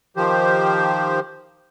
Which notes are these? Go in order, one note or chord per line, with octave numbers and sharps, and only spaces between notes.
D#3 F3 G4 C5